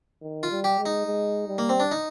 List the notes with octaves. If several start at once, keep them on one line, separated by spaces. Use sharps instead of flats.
D#3
F4
G3
G4
G#3
D#4
G#3
G3
A#3
C4
D4
D#4